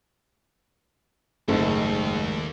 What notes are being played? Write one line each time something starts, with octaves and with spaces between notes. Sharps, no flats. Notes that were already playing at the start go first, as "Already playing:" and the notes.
F#1 D#2 G#2 G#3 A3